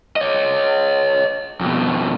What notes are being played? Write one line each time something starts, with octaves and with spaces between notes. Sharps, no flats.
C#5 D#5
F2 B2